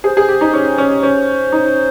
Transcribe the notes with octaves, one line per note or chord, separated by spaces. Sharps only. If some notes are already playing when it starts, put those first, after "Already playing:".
G#4 C5
G#4
G4
D#4
C#4
C#4
C#4 C5
D#4